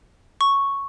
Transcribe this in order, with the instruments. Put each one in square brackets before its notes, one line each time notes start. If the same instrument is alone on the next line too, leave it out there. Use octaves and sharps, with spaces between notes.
[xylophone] C#6